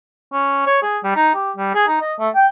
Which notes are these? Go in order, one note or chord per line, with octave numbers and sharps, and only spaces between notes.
C#4
C#5
G#4
G3
D#4
G4
G3
G#4
D#4
D#5
A3
G5